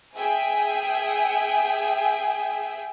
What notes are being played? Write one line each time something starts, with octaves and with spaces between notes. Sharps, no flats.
G#4 E5 G5 G#5